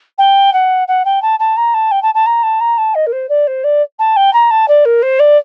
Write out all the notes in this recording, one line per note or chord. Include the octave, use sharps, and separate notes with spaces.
G5
F#5
F#5
G5
A5
A5
A#5
A5
G5
A5
A5
A#5
A5
A#5
A5
D#5
A#4
C5
D5
C5
D5
A5
G5
A#5
A5
D5
A#4
C5
D5